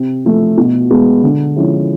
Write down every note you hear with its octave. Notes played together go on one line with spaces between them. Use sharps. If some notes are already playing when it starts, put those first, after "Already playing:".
Already playing: C3
F3 A3
B2
G#3 B3
D3
F3 G#3 C#4 E4